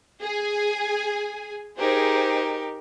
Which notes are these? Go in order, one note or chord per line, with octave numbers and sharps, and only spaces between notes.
G#4 G#5
D#4 G4 G#4 A#4 C5